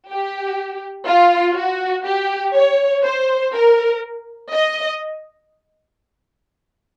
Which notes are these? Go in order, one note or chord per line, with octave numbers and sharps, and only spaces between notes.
G4
F4
F#4
G4
C#5
C5
A#4
D#5